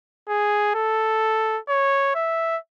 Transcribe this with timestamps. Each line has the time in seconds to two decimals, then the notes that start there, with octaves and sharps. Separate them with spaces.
0.28 G#4
0.75 A4
1.69 C#5
2.15 E5